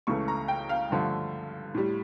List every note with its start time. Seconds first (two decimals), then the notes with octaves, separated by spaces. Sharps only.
0.07 C#2 C#3 E3 A3 C#6
0.28 A#5
0.48 G5
0.69 F5
0.90 G2 D3 F3 A3
1.74 A2 G3